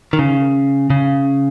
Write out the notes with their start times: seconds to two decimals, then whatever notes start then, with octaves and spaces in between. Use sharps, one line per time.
0.13 D#3
0.19 C#3
0.90 C#3